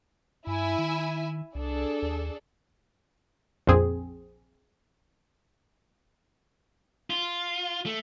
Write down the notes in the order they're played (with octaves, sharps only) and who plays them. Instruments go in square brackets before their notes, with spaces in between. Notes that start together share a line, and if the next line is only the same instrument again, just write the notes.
[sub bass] G2 [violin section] E4 E5 G#5
[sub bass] D#3
[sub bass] C2 [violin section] D4 G#4 A4
[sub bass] D#2
[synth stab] A#1 F2 C4 G#4
[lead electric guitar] F4
A3